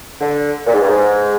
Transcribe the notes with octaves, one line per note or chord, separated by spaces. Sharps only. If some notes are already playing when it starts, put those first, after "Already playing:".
D3
A#2
G#2
G2
G#2